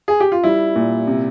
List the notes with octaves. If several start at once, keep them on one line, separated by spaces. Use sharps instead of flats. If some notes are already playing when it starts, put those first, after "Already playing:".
G#4
G4
F4
G3 E4
A#2
C3